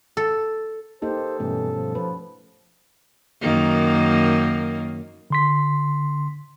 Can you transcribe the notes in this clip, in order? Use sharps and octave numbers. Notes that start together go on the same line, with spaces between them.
A4
A#3 D#4 G4 A4 C5
G2 B2 E3 A3 C#4
F3
F3 B4
F#2 D#3 A#3
D3 C6 B6